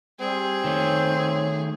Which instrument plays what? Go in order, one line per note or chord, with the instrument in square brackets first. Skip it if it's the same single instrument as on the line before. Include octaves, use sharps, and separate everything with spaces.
[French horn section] G3 [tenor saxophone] C4 [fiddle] G#4
[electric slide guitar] D#3 A3 [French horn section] C#5